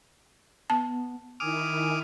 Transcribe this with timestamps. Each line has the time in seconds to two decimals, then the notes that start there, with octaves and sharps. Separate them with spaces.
0.70 B3 A5
1.40 D#3 E4 G#5 D6 D#6 F6